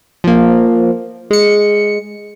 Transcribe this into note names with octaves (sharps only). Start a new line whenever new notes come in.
F3 A#3
G#3 C#7